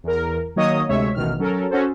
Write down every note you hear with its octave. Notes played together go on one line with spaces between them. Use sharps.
E2 A#4
D#3 F#3 A#3 C#5 D#5 D#6
D2 C3 G#3 C#5 E5
A1 B2 D#3 F6
F#3 C#4 A4 A#4
C#4 F#4 A4 C5